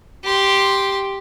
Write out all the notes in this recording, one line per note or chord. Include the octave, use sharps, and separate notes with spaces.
G4 C6